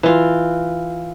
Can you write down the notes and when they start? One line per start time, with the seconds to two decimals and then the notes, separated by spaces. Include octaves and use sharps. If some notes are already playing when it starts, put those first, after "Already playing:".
0.03 E3 F4